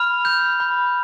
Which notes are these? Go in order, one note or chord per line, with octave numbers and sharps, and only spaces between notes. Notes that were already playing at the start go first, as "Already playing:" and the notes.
Already playing: B5 F6 F7
G6
B5